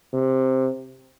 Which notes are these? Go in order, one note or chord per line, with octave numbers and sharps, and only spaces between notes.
C3